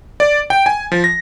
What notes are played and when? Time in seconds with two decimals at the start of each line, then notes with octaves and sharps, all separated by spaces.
0.20 D5
0.50 G5
0.66 G#5
0.92 F3
1.04 A#6